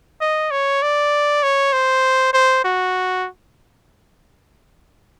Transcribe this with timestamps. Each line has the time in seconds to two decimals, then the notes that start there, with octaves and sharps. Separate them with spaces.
0.21 D#5
0.51 C#5
0.82 D5
1.43 C#5
1.73 C5
2.33 C5
2.64 F#4